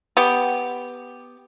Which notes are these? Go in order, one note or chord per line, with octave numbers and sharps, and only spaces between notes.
B3 G4